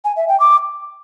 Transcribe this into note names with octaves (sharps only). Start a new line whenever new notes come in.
G#5
E5
G5
D6